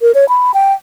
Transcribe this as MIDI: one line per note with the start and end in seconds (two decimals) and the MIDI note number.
0.01 0.12 70
0.15 0.28 73
0.29 0.52 83
0.54 0.73 79